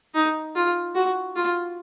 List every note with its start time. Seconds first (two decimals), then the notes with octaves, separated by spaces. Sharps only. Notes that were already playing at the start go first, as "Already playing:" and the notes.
0.14 D#4
0.55 F4
0.95 F#4
1.36 F4